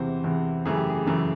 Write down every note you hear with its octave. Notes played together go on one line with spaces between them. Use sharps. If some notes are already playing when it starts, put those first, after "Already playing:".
Already playing: E2 C3 E3 C5
E2 C3 E3
F#2 C#3 E3 A3 G#4
G4
G#4
F#2 C#3 E3 A3